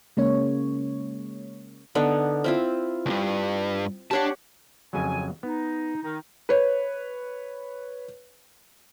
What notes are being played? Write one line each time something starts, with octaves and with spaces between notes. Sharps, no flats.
C#3 G#3 A#3 C#4 C#5
D3 B3 D#4
C4 E4 F4
C#2 G2
D4 G4 C#5 F#5 A5
F2 C#3 F#3 G#5
B3 D#4
D#3 D#4
B4 C#5